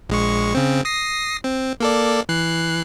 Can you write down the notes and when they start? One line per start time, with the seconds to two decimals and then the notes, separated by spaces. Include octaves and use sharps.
0.09 A#1 G#3 C#6
0.55 C#3 C4
0.85 D#6 A#6 C7
1.44 C4
1.80 A#3 A4 D5
2.29 E3 F#6 C7